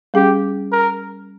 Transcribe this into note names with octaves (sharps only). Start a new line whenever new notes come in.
G3 C#4 G4 G#4
A#4